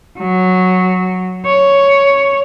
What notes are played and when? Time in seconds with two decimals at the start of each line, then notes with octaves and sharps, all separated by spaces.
0.19 F#3
1.46 C#5